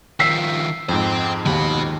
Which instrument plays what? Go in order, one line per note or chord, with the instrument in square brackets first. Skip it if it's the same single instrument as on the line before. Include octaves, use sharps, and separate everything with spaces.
[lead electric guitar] D#3 F3 [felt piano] E6 B6 C7
[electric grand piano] F2 G#2 [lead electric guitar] C5 G5
[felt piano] D#2 [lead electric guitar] B2 B5